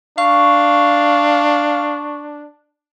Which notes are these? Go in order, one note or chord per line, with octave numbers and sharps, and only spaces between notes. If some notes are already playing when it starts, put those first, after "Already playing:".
D4 F5 C#6